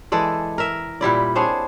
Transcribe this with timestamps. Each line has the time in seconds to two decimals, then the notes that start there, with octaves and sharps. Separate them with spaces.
0.12 E3 G#3 A4 D5
0.58 A#4 E5
1.01 A#2 G3 E4 D5
1.36 C4 D4 G#4 C#5